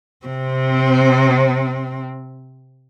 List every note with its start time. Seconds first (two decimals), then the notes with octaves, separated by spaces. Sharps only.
0.26 C3 C4